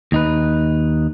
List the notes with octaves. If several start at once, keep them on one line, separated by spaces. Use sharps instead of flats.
D#2 D#4 B4